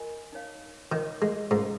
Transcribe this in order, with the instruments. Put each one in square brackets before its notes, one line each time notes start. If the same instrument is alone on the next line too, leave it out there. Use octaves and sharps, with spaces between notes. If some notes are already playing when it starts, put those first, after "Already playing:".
Already playing: [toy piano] F4 A#4 D#5 G#5
D#4 C#5 F5
[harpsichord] D#3 [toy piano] D#4 A#4 C#5
[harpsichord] G#3
[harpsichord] G#2 [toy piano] C#4 A#4 F5 A#5